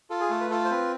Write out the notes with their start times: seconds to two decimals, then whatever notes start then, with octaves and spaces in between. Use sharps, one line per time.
0.10 F4 A4
0.20 G#4
0.30 A3 A4
0.41 B4
0.51 F4 A4
0.65 C5
0.71 C4 B4